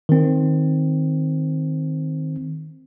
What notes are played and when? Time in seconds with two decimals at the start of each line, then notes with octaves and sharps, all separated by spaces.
0.09 D#3 C4